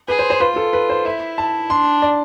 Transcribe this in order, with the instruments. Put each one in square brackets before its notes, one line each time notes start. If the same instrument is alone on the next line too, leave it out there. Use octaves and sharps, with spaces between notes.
[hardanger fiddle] G#4 [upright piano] B4
[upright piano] C5
C5
[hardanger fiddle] F4 [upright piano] B4
[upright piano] A4
B4
C5
[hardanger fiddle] E4 [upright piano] E5
[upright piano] A5
[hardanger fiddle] D4 [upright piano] C6
[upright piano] D5